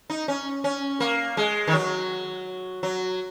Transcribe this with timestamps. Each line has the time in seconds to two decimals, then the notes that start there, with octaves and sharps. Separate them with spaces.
0.10 D#4
0.28 C#4
0.64 C#4
1.00 A#3
1.37 G#3
1.67 D#3
1.73 F#3
2.83 F#3